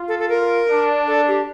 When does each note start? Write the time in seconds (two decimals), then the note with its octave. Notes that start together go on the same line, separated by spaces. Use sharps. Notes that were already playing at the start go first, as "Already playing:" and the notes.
Already playing: F4
0.08 A4
0.19 A4
0.29 A#4
0.68 D4
1.07 A4
1.28 G4